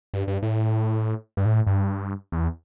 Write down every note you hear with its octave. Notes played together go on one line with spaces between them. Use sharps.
G2
G2
A2
G2
A2
G2
E2